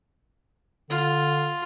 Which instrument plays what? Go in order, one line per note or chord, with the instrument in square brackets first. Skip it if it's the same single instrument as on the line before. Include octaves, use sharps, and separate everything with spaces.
[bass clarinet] D3 [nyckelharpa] F4